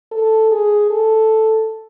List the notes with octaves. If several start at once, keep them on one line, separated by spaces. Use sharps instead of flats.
A4
G#4
A4